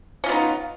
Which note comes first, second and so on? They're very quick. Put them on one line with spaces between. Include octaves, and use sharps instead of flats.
C#4 F4 B3 D#4